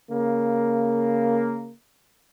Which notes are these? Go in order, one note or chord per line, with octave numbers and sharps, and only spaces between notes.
C#3 A#3